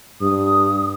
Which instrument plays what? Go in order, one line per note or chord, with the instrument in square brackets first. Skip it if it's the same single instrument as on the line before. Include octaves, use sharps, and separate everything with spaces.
[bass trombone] G2 [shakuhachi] D#6